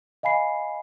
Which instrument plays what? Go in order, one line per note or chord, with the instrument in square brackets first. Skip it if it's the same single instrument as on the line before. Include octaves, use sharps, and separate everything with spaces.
[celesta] D#5 F5 G#5 B5 C7